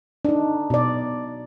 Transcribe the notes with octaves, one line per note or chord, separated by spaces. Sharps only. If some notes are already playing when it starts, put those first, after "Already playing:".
D4 D#4
B2 D5